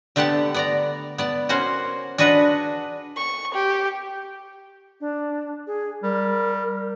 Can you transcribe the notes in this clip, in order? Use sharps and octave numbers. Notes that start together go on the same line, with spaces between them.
D3 A3 B3 G4 F#5 A5
B3 D5 A#5
B3 D5 A5
A#3 C#4 F#4 C5
D4 F#4 G#4 B4 D#5 F#5
C#6
G4
D4
G#4
G3 A#4